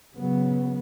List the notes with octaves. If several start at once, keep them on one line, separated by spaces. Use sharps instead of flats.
C#3 F#3 B3